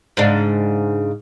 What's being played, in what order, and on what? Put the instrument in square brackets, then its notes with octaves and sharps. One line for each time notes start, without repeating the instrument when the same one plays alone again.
[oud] G#2 C#3 D4